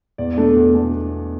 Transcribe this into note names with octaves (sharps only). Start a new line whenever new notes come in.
E2 D5
B2 A3 D4
E2
B2 A3 D4